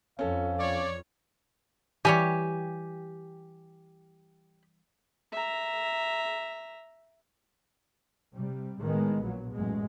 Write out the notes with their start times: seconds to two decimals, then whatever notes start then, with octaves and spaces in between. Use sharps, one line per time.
0.19 F2 C#4 A4 F5
0.60 C#5 D5
2.05 E3 G3 G4 C#5 G#5
5.33 E5 A#5
8.34 C3 G3
8.81 A2 D#3 G#3 B3
9.22 A#1 A#2 F#3
9.52 A1 F#2 B2 G#3